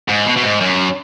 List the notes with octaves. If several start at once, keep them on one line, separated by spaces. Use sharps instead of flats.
G#2
B2
B2
G#2
F#2